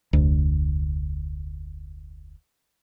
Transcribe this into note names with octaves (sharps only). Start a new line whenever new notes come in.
F1 D2